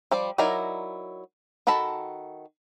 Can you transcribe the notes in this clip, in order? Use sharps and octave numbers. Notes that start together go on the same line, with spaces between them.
F3 G3 D5
F#3 D#4 E4 A#4 D5
D#3 F#4 A4 A5 B5